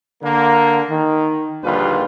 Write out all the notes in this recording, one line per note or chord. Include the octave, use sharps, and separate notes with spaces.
D3 A#3
D#3
A#1 D#2 D3 G3 F4 B4